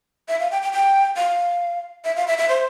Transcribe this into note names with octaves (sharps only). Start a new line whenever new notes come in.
E5
F5
G5
G5
G5
F5
E5
F5
E5
E5
C5